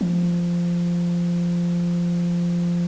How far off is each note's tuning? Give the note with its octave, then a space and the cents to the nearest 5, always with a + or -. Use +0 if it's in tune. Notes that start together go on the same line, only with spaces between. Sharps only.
F3 -10